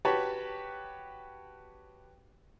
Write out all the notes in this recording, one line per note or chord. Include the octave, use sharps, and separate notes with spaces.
F#4 G4 B4 C#5 A5